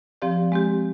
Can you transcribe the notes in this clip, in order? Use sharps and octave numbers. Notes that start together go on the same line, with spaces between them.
F3 C4 G4 D5 F5
G#3 C4 G4